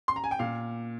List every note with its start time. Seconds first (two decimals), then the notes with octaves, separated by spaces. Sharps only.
0.08 C6
0.16 A#5
0.24 G#5
0.31 G5
0.39 A#2 F5